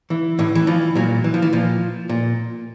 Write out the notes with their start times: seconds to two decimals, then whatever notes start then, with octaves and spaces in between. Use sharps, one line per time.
0.10 E3
0.39 A2 E3
0.55 E3
0.67 E3 F3
0.95 A#2 F#3
1.24 E3
1.34 F3
1.42 E3
1.53 A#2 F3
2.09 A#2